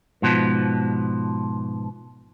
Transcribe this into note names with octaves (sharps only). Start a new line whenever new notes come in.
G#2 B2 F3